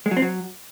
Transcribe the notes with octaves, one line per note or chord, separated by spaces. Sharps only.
G#3
F#3
C4
F#3